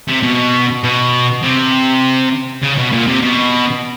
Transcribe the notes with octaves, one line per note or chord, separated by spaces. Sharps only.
C3
B2
B2
C3
C#3
B2
A#2
C3
B2